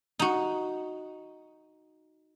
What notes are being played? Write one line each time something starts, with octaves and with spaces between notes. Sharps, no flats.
D#4 F#4